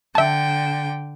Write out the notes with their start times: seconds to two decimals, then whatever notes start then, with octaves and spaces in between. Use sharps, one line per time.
0.15 D3 E5 G5 A5